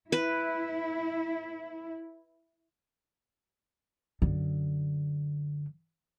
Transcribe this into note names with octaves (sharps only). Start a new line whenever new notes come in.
E4 B4
F#2 D3